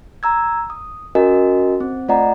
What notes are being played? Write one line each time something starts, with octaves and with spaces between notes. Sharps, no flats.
A#5 E6 G#6
D#6
C#4 F#4 A#4 D#5 G#5
C4
A3 F4 D5 D#5 F#5 A#5